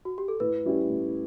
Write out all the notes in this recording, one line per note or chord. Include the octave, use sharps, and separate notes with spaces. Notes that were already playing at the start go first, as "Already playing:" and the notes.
F#4
G4
A4
A2 B4
G3 C#4 E4 G4
A2